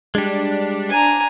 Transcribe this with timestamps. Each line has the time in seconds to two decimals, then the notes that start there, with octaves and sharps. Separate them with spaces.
0.15 G3 G#3 D4
0.90 G#5 A#5